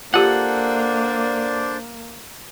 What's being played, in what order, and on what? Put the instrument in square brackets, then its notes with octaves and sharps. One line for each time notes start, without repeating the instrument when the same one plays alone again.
[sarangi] A#3 [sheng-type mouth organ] D4 C5 D5 [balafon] F4 G4 [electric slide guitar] A4 F#5